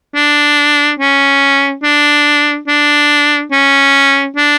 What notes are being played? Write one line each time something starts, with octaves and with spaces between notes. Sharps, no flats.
D4
C#4
D4
D4
C#4
D4